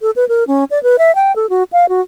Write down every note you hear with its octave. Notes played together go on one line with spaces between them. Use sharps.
A4
B4
A#4
C#4
D5
B4
E5
G5
A4
F#4
F5
F#4